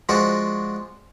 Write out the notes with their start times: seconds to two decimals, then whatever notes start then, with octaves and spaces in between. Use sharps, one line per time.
0.09 F3 G#3 D4 F#4